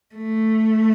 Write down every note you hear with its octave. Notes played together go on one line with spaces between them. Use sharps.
A3